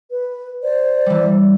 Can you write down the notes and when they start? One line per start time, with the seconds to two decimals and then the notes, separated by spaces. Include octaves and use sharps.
0.09 B4
0.62 C5 D5
1.06 E3 G3